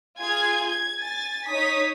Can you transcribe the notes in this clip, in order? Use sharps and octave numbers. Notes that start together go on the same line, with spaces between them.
F4 G#4 G#5 G#6
G#6
G#5 A6
D#4 C#5 D#6 B6